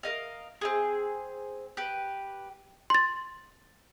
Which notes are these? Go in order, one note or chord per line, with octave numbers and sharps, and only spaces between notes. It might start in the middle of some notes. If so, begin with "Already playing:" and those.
A#4 D#5 F5
C4 F4 G#4
G4 B4
C6 A6